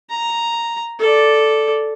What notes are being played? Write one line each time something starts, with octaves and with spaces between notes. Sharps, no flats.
A#5
A4 D5